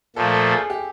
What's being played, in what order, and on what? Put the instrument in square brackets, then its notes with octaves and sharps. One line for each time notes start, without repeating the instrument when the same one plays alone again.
[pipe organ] A#2 F3 A3 [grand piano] A4
[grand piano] A4
G#4
G4